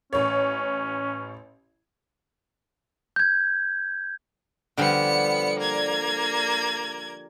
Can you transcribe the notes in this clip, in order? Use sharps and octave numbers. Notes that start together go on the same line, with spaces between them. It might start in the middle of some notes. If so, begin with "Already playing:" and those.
A1 C#4 C#5
G6 G#6
D3 F3 G3 B3 C#7
A#3 G#6